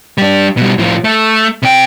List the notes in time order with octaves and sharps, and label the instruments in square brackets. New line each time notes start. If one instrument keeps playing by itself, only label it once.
[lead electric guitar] G3 D4
B2 G3
A2 F3
A3
C3 G5